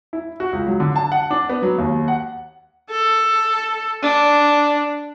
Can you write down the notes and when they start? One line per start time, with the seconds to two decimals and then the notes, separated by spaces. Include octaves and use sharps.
0.13 E4
0.40 F#4
0.53 C#2
0.67 F#3
0.80 D3
0.96 A5
1.12 F#5
1.31 D4
1.49 B3
1.62 F#3
1.78 D#2
2.08 F#5
2.91 A4
4.03 D4